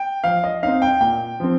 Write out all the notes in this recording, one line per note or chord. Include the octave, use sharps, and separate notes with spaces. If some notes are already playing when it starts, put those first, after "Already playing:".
Already playing: G5
F3 F5
D#5
C4 D#4 F5
G5
A#2 G5
F3 C4